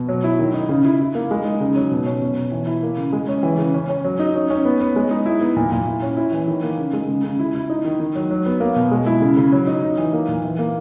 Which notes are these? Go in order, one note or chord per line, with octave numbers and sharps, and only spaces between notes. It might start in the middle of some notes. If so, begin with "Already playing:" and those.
Already playing: B2
F#3
E4
D#3
D#4
C#3
E4
E4
A#3
G#3
D#4
C#3
F#3
B2
C#4
B2
B2
E3
E4
A#3
C#3
G#3
C#4
E3
C#3
C#4
C#4
F#3
D#4
C#4
C#4
B3
B3
G#3
D#4
E4
B3
A#2
A#2
E4
C#4
E4
E3
D#3
A#3
C#3
G#3
C#3
C#3
E4
E4
D#4
D#3
D#3
F#3
F#3
B3
A#3
B2
G#3
E4
C#3
C#3
F#3
D#4
D#4
E3
A#3
A#2
E3
A#3